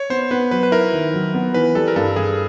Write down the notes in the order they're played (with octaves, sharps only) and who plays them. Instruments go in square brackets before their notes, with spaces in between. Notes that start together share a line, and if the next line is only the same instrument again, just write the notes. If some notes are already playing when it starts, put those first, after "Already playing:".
Already playing: [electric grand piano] C#5
[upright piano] B3 [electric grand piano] C5
[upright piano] B3 [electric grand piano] B4
[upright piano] F#3 [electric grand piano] B4
[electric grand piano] B4
[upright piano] E4 [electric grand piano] A#4
[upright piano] D#3
F#3
B3
[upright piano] E3 [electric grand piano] B4
[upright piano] G3 [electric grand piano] A4
[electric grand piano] A#4
[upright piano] G2 [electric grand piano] A4
[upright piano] G2 [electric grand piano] G#4